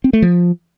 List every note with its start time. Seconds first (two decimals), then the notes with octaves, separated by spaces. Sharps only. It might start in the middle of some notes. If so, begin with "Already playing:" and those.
0.04 C4
0.13 A3
0.22 F3